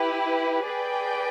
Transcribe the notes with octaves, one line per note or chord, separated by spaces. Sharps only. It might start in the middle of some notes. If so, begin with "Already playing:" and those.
Already playing: E4 G4 B4
G#4 B4 D5 G5